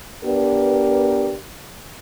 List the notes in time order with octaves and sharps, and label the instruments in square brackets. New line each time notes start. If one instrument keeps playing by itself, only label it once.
[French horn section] B3 D4 G4 A#4 B4